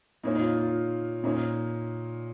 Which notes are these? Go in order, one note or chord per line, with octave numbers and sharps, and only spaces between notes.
A#2 A#3 C#4 D#4
D#4
F4
F4
A#2 A#3 C#4 D#4